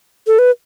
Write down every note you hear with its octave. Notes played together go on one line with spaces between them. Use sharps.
A4
B4